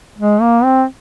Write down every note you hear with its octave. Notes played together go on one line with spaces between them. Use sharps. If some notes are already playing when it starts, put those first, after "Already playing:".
G#3
A#3
C4